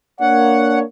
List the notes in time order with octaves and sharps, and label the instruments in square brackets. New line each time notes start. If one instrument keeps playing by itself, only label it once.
[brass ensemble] A#3 D4 C#5 [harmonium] F#5